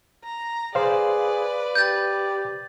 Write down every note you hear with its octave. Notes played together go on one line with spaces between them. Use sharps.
A#5
G#4 B4 C5 D5 F5
G4 G6 A6